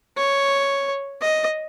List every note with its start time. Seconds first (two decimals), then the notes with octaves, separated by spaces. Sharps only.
0.18 C#5
1.22 D#5